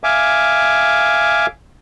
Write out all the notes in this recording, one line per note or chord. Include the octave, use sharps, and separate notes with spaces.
E5 F5 G#5 D6